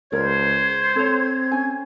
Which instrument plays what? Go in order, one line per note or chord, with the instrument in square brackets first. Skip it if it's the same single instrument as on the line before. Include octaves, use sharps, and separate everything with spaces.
[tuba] C#2 [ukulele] A#4 D5 [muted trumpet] C5 [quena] G#6
[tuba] C4 [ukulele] A4 C#5
[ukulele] C#4 G#5